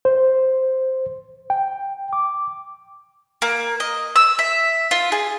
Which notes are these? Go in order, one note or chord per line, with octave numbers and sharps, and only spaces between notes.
C5
G5
D6
A#3
D#5
E6
E5
F4
G#4